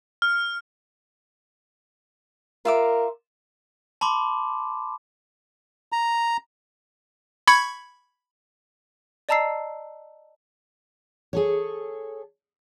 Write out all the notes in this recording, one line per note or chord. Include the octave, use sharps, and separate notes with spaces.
F6
F4 A#4 E5 D6
A5 B5 C6 D6
A#5
B5 C#6 G#6 C#7
D5 D#5 A5 A#5 E6 C7
G#4 A4 C#5